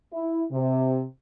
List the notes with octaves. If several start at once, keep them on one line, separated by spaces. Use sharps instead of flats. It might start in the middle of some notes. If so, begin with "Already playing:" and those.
E4
C3